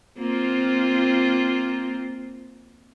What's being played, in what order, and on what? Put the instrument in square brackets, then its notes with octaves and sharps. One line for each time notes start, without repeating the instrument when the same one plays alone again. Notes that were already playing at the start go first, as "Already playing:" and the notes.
[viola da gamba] A#3 C4 F4